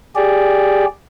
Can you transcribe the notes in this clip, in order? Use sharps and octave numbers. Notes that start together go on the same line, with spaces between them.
G4 G#4 D5